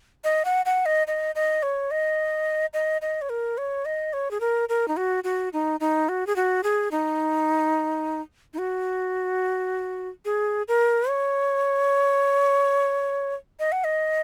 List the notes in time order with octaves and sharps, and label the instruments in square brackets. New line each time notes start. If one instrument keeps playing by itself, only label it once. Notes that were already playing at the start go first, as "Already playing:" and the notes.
[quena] D#5
F#5
F#5
D#5
D#5
D#5
C#5
D#5
D#5
D#5
C#5
A#4
C#5
D#5
C#5
G#4
A#4
A#4
D#4
F#4
F#4
D#4
D#4
F#4
G#4
F#4
G#4
D#4
D#4
F#4
G#4
A#4
C#5
D#5
F#5
D#5